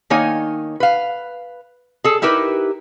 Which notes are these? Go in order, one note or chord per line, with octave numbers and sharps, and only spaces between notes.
D#3 A#3 D#4 C#5 G#5
B4 F5
G#4 A4
D#4 E4 G4 A#4 B4